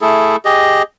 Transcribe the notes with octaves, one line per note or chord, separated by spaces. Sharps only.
A3 E4 G#4 A4
G4 G#4 D#5